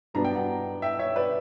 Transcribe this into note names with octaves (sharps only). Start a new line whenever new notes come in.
G2 F#3 B3 D4 A#5
G5
F#5 A#5
E5 G5
C#5 E5
B4 D5